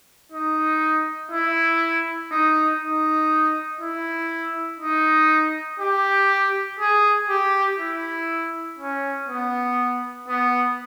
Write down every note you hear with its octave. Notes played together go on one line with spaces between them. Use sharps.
D#4
E4
D#4
D#4
E4
D#4
G4
G#4
G4
E4
C#4
B3
B3